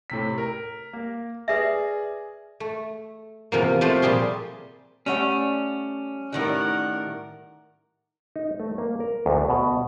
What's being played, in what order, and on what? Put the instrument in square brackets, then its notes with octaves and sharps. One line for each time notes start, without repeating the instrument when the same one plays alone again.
[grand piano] A2 C3 B6
A#4
A#3
[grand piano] G#4 D5 [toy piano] B4 E5
[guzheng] A3
E2 C3 F3 A#3
C3 F3 A3 C5
A#2 G3 G4 G#4 C6
[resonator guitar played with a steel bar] G3 A3 F#5 [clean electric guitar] C#4
[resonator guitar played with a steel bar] A2 D#3 G3 [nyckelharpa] A#4 F#5
[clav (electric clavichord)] D#4
A3
A#3
A#4
D2
B2